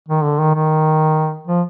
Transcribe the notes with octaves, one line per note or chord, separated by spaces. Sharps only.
D#3
D3
D#3
D#3
F3